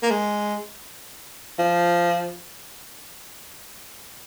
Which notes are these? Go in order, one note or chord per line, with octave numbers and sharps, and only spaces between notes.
A#3
G#3
F3